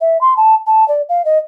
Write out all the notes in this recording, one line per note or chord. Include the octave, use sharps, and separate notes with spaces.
E5
C6
A5
A5
D5
F5
D#5